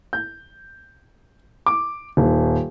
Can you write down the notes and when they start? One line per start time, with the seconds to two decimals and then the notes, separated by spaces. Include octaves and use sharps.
0.13 G6
1.66 D6
2.17 D#1